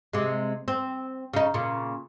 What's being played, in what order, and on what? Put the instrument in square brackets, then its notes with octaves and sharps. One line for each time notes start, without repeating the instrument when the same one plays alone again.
[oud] C3 G#3
C4
C#3 D#4
A#2 C#3